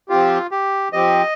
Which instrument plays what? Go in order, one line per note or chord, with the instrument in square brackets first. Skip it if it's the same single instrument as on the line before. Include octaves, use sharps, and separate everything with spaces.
[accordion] F3 C4 G4 [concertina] F4
[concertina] G4
[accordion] F3 C4 G4 [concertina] D#5